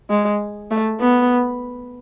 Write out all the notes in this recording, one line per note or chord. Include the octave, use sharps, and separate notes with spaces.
G#3
A3
B3